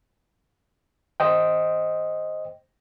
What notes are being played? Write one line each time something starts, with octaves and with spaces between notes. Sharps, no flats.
C5 D#5 G5